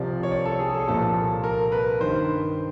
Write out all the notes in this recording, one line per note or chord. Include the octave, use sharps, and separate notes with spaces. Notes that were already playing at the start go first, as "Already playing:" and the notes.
Already playing: C2 C3 F3 D5
C#5
D5
A4
G#4
A4
C2 A#2 F3 A4
A#4
B4
G2 D#3 C5